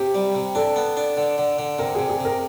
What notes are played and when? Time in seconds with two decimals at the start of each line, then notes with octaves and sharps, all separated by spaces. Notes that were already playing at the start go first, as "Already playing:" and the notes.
Already playing: C3 G4
0.15 G3
0.35 C3
0.55 D4 A4
0.76 B3
0.97 D4
1.17 D3
1.38 D3
1.59 D3
1.79 C3 A#4
1.95 C3 G#4
2.09 G#4
2.20 C3
2.25 A#4